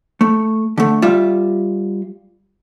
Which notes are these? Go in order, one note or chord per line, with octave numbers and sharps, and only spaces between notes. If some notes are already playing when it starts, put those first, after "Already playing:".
A3
D3 A3
G3 F4 E5